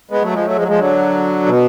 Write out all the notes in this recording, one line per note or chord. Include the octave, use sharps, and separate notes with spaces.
G#3 B3
F#3 A3
F3 G#3
F#3 A3
F3 G#3
F#3
F3 G#3
D3 F#3
B2